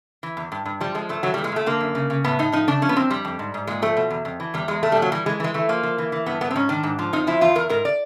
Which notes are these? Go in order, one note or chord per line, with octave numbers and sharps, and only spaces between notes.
E3
E2
G2
G2
F3 G3
F3 G#3
G2 A3
E3 F#3
A#2 G3
G#3
A#2 A3
D3 A#3
F#2
C#3
C#3
A2 B3
A2 D#4
F3 D#4
C#3 D4
F3 C#4
B3
A#2 C4
F2 G3
F2
G#2
G#2
A#2 G#3
F3 A3
B2
E2
F2
E3
E2 G3
E2 G#3
A#2 A3
G3
A#2
F#3
E3 G3
E3 G#3
E3 G#3
E3 A3
F3 A#3
F3
E3
E3
G2 B3
G2 B3
C4
G#2 C#4
D#3 D4
G#2
F3
F2 D#4
F3 E4
E2 F4
E2 A#4
G#2 A#4
D5